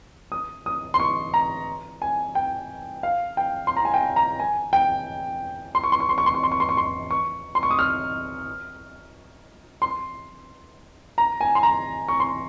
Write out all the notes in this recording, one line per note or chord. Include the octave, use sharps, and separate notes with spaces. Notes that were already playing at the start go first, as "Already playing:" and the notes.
D#6
D#6
C6
C#6
A#5
G#5
G5
F5
G5
C6
A#5
G#5
G5
A#5
G#5
G5
C6
C#6
C6
C#6
C6
C#6
C6
C#6
C6
C#6
C6
C#6
C6
C#6
C6
C#6
D#6
F6
C6
A#5
G#5
C6
A#5
C#6
C6